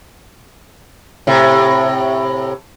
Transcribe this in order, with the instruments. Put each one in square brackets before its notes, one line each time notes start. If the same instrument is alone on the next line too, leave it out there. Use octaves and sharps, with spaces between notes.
[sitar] A2 C3